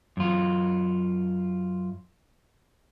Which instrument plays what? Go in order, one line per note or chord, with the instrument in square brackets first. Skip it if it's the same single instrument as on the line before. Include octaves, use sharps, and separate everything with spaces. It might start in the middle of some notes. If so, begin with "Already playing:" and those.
[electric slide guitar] F#2 F4